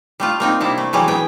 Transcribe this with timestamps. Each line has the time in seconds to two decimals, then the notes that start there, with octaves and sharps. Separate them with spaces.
0.20 G3 A3 F4
0.40 A#3 C4 D#4
0.61 C3 G3 D4 E4
0.78 A3
0.93 E3 F#3 G3 G#4
1.08 B3 G#4 G5